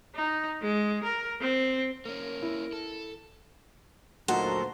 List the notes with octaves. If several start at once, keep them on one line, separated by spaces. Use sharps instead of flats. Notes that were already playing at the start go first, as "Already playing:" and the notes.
D#4
G#3
A#4
C4
A#3 C#4 A#4
E4
A4
D2 A#2 F#3 D#4 F#4 A4 A#4 C5